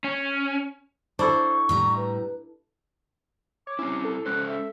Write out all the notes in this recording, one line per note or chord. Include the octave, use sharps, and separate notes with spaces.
C#4
D4 E4 A4 C5 C#6
A2 G3 A#5
B4
C#5 D6
C4 C#4 E4
A4
G#3 C#4 C5 F#6
E5